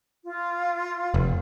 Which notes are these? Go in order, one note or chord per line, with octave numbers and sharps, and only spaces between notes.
F4
F1